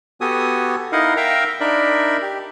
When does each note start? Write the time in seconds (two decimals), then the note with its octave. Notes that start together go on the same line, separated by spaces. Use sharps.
0.21 B3 F#4 G4 A4 G#5 D#6
0.92 D#4 E4 A#4 D#5 F5 F#5
1.17 A#4 E5 F5 G5 A#5
1.60 D4 D#4 A#4 D5 E5 B5
2.22 G4